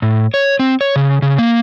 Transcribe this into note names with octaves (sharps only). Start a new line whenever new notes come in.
A2
C#5
C4
C#5
C#3
C#3
A#3